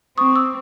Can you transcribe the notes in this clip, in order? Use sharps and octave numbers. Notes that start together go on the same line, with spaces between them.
C4 C#6 D#6
D6 E6